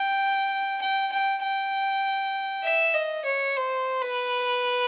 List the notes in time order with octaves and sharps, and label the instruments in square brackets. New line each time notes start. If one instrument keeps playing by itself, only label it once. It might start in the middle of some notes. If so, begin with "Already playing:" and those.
Already playing: [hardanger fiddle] G5
G5
G5
G5
E5
D#5
C#5
C5
B4